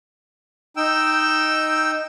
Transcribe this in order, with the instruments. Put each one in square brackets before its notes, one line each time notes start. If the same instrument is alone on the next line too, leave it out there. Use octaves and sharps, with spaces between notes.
[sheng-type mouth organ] D#4 G5 E6